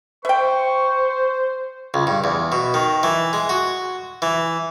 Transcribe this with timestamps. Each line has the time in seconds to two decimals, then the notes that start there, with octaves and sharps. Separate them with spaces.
0.25 C5 E5 G5 C#6
1.94 C#2
2.07 G2
2.24 E2
2.52 B2
2.74 D#3
3.03 E3
3.33 G#3
3.49 F#4
4.22 E3